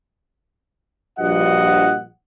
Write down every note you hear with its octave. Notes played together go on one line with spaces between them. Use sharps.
A#1 G2 F3 F#4 D#5 F#5